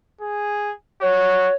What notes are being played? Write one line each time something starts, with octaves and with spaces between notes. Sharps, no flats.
G#4
F#4 C#5